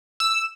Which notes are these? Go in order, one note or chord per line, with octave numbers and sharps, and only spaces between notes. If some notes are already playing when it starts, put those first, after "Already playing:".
E6